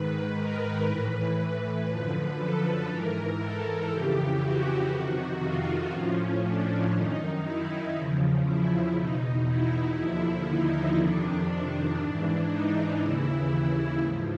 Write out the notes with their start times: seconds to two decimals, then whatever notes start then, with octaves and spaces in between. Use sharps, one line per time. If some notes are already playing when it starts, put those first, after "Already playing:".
Already playing: G#2 D#3 B4
0.36 A#4
0.85 A2 E3 B4
1.37 B4
1.87 F#2 D3 F3 B4
2.38 A4
2.88 G#2 E3 A#4
3.39 A4
3.89 F2 C#3 E3 G4
4.40 F#4
4.90 F2 C3 D#3 F#4
5.41 F4
5.91 A2 F3 C#4
6.42 D4
6.92 F#2 D#3 D#4
7.43 E4
7.93 E2 C#3 F3
8.44 E4
8.94 E2 B2 D#4
9.46 E4
9.96 D#2 D3 F3 E4
10.47 D#4
10.97 F2 C3 D#3 D4
11.98 G#2 E3 D4
12.49 D#4
12.99 D#2 C#3 E3 E4
14.00 G#2 F3